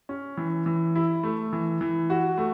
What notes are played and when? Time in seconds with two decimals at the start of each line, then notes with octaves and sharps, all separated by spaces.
0.09 C#4
0.37 E3
0.66 E3
0.95 E4
1.23 A3
1.53 E3
1.81 E3
2.10 F#4
2.38 A3